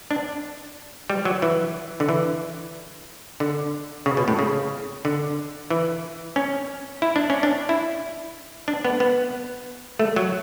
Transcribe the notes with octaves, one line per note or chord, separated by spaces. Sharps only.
D4
G3
F#3
E3
D3
E3
D3
C#3
B2
A2
C#3
D3
E3
C#4
E4
D4
C#4
D4
E4
D4
B3
B3
A3
F#3